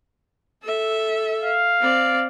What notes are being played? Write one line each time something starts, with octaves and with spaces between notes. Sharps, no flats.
A4 E5
F5
C4 D5